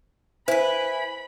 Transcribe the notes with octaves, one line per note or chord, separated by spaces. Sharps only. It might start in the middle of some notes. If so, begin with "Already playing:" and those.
E4 B4 C5 G#5 B5